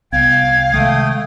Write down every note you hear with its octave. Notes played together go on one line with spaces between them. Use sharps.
C2 B3 F5 G5 G#6
C3 D#3 G#3 A3 G5 D#6